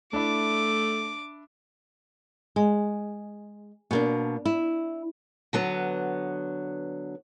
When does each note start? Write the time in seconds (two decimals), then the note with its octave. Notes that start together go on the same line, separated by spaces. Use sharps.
0.13 A3 D4 E4 D6
2.56 G#3
3.91 B2 A#3 D4
4.45 E4
5.53 D3 F#3 B3